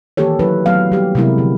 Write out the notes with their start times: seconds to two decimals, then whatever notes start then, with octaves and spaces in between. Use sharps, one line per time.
0.17 D#3 E3 A#3 G4 A4 C#5
0.39 F#3 C#4 E4 B4
0.66 F#3 A3 B3 F5
0.92 G3 A#3 G4
1.15 C3 F#3 G#3 B3 E4 A#4
1.38 D3 F3